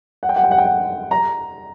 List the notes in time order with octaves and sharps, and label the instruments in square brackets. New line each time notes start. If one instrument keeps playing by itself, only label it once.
[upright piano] F#5
G5
F#5
G5
F#5
G5
F#5
A#5